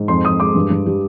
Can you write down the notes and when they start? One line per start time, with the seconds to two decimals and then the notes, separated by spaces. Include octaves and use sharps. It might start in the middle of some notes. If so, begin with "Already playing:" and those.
Already playing: G#2
0.08 F2 C6
0.25 F2 D#6
0.40 G#3 D6
0.55 G2
0.70 G2
0.86 G3